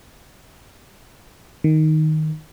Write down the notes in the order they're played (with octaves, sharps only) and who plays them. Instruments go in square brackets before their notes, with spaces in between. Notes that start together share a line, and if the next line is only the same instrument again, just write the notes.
[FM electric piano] D#3